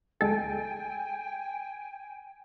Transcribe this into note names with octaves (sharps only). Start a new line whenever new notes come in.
D2 G#3 A4 G5 G#5